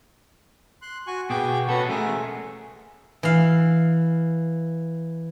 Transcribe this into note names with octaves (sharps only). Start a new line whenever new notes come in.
C6 F#6
F#4 G#5 C#6
B2 F#4 G#4 G5 D6
C#4 F#4 A4 B4 F#5
A3 G#4 A#4 G#5
E3 F5